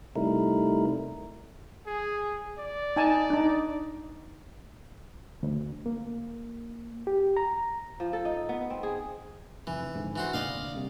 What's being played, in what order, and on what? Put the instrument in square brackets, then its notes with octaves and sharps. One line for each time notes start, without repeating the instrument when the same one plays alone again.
[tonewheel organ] C3 G3 A3 D#4 E4 A#4
[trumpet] G#4
D5
[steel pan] D#4 G#5 A5
D4 D#4
[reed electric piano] D2
A#3
G4
A#5
[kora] F3
A4
D#4
B3
C4
G#4
[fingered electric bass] F1 [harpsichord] E3
[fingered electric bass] F2 G#2 D3
[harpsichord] E3 F#4 C5
[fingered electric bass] F1 A#2 D3 [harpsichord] D5 D#5 F5
[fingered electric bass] C2 C3